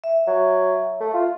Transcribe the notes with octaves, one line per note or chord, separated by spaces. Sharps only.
E5
F#3
A3
F4